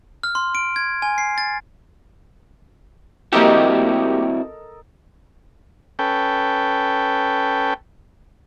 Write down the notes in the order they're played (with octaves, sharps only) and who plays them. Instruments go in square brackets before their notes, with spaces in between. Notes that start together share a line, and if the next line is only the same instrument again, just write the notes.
[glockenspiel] F6
C6
D7
G#6
G#5
C7
A6
[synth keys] A#3 G4 [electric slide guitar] C4 E4 F#4 [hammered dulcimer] A4 A#4 D#5
[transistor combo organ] C#4 A4 B4 G5